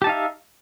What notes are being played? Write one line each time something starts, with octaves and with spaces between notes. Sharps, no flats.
D#4 G4 E5 F5 A5